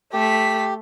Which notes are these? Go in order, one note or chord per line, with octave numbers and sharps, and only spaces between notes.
A3 G4 B6